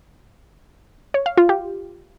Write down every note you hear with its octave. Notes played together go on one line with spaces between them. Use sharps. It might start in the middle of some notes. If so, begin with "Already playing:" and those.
C#5
F5
F4
G4